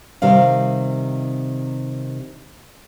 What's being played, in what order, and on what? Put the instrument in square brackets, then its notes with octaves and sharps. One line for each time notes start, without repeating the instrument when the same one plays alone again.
[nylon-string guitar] C3 D#3 G3 F5